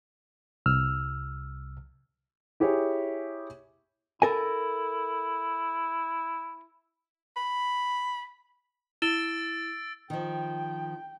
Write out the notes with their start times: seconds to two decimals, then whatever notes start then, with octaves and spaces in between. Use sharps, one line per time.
0.66 C2 E6 F6
2.60 E4 G4 G#4 C#5
4.22 E4 A4 A#4 G#5
7.36 B5
9.02 E4 E6 A6 D7 E7 G7
10.10 D#3 F3 G5